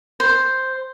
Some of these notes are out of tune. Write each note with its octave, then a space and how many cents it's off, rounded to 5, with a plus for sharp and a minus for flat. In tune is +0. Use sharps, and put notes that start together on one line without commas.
C5 +0